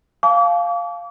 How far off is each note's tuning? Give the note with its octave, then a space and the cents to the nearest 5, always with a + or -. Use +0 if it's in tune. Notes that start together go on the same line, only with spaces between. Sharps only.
F5 +0 A5 -40 D6 -40